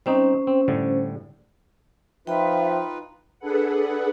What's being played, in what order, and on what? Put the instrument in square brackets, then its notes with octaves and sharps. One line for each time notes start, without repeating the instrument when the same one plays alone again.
[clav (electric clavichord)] G3 C4 D#4 [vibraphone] C#4 C5
[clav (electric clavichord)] C4
A2 D3 G3
[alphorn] F3 [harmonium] D#4 F4 B4 [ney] E5 [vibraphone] G5 B5
[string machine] D4 G#4 A4 B4 F#5